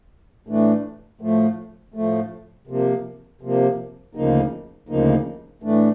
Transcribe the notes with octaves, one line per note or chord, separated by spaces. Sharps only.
A2 E3 A3 D4
A2 F3 A3
A2 F3 A3
C3 F3 A#3
C3 F3 A#3
D2 C#3 F3 A#3 D#4
D2 C#3 F3 A#3 D#4
A2 E3 A3 D4